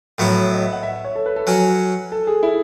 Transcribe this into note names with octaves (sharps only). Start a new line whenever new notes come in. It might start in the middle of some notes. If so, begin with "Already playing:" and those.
A2 F#3 B3 E4 E5
D#5
E5
F#5
E5
E5
C#5
A4
B4
A4
F#3 C#4 F#4 B4
A4
G#4
E4